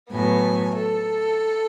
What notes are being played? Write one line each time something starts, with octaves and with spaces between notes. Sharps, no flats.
A2 F#3 B3 G#5
A4